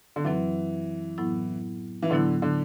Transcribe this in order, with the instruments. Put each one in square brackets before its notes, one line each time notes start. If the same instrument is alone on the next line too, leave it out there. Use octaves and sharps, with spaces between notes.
[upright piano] D3
[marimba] F#2 F#3 C4 [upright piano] E3
[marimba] A2 F#3 B3 E4
[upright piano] E3
[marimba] A2 F#3 B3 E4 [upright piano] D3
[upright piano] D3